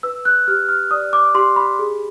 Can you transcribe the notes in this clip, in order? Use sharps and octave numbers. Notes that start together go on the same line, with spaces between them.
B4 E6
F#6
G4 F6
F6
D5 D#6
D6
G4 C6
B5
G#4